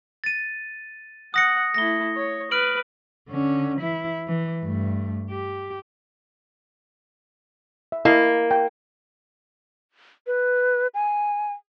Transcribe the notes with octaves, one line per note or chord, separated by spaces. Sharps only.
A6 D#7
F#5 D#6 A#6 C#7
A3 E4 A#6 G7
C#5
B4 F6 D7 F#7
D3 C#4
E3 E4
E3
G2 A3
G4
E5
A#3 E4 D#5 A5
G5
B4
G#5